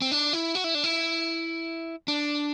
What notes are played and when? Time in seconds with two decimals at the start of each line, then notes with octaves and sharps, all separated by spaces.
0.02 C4
0.11 D4
0.33 E4
0.55 F#4
0.64 E4
0.75 D4
0.84 E4
2.08 D4